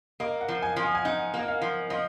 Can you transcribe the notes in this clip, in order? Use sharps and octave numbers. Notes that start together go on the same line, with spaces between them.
A#3 D#5
F#5
F3
G#5
F3
G#5
G#5
D#4 F#5
A#3
D#5
F5
F3
F3 D#5